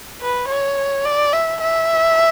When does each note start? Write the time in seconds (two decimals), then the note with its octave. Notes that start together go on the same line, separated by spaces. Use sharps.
0.21 B4
0.48 C#5
1.05 D5
1.33 E5
1.61 E5